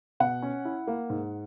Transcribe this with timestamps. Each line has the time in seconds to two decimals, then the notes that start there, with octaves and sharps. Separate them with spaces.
0.20 B2 F#5
0.42 C#4
0.65 E4
0.87 A#3
1.10 G#2